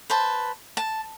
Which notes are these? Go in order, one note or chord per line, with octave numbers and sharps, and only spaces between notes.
B4 C5 A5
A5